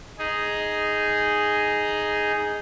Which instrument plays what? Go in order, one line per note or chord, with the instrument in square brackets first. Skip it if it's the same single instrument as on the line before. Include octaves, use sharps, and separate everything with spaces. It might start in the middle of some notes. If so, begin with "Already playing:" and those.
[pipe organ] D#4 G#4